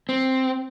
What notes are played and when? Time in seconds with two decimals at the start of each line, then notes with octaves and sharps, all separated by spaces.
0.09 C4